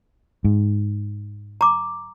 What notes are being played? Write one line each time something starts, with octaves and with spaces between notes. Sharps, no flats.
G#2
A#5 D6